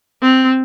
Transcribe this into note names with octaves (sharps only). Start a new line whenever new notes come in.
C4